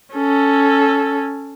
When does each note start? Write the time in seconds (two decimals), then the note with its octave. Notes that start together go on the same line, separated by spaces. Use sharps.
0.14 C#4 A4